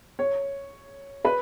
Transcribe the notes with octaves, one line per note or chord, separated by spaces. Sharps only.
C#5
B4